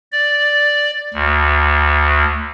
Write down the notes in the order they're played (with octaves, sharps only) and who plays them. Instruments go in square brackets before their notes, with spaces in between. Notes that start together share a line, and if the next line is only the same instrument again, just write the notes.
[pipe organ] D5
D2